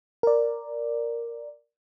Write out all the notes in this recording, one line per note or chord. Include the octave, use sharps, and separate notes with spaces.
A#4 D5